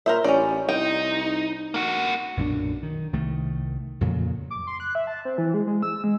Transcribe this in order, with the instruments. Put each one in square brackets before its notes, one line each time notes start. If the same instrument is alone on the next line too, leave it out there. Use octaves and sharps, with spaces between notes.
[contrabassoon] A#2 [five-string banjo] A#4 C5 E5
[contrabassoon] A1 [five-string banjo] C#4 D5
[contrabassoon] C2 [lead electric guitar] D#4 [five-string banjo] G5
[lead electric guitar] A#3 F#4
[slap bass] B1 F#2 A#2 D4
D#3
C2 D#3 A3
F2 A#2 C#3 F#3
[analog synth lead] D6
C6
F#6
E5
A5
C4
E3
G#3
G#3
E6
G#3